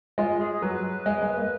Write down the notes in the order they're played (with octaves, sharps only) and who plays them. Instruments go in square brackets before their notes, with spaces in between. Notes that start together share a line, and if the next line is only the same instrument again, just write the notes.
[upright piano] G#3 [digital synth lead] F4
[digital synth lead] G#4
[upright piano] F#3 [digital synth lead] B4
[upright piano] G#3
G#3
A#3